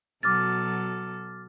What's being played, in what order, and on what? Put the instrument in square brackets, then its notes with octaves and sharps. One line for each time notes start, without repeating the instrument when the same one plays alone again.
[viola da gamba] B2 F#3 A4 [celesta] D6 F6 A6